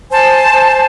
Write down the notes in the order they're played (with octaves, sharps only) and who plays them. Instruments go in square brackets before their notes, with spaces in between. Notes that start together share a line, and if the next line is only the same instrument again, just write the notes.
[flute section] C5 G#5 A5